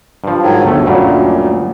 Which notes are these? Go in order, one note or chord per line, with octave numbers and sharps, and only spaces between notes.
G2 F3
G#2 D#3 F#3
G1 D2 A3
F#2 A#2 G3